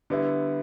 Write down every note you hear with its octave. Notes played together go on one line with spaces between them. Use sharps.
D3 G3 B3 E4